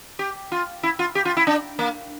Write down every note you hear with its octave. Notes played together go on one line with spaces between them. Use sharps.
G4
F4
E4
F4
G4
F4
E4
D4
A#3